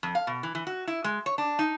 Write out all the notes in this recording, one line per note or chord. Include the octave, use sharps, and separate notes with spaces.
F2
F5
B2
E3
E3
F#4
E4
G#3
C#5
D4
D#4